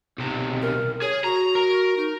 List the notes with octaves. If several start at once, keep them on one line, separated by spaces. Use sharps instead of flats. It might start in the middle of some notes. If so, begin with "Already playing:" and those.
B1 C3
A#4
G#4 C#5
F#4 A#5
A#4
D#4